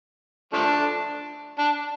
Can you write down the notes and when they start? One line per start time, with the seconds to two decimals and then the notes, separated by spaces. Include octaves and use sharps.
0.53 F3 A3 D4
1.59 D4